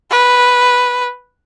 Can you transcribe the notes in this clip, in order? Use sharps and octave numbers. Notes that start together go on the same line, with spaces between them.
B4